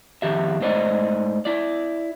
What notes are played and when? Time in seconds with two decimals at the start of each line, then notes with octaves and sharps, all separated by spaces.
0.22 F2 D#3 G4 E5
0.61 G#2 A3 C5 D5 D#5
1.45 E4 D5